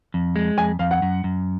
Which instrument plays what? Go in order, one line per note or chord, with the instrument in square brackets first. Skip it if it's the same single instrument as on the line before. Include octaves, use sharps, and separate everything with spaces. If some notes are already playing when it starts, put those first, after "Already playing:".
[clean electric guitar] F2
G#3
[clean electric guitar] F2 [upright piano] G#5
[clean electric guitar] F2 [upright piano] F5
[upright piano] F#5
[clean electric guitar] F#2
F#2